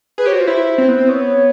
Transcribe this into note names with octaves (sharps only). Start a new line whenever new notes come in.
G#4 B4
G4 C#5
F#4 C5
F4
E4 C5
C4
B3
C4
B3 C#5